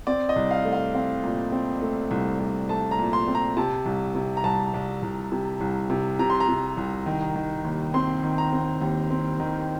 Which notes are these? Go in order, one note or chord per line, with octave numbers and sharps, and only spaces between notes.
C4 D5
D#5
C2
F5
A3
F5
C4 F5
A#2
C4
A3
C2
C2
A3 A5
A#5
A#2
C6
C4
A#5
C3 A5
C2
C3
A#5
C2 A5
C2
C2
C3
C2
C3
C3 A#5
C6
A#5
C3
C2
D#3
D#3
D#2
C4 C6
D#3
A#5
C4
D#2
C4
D#3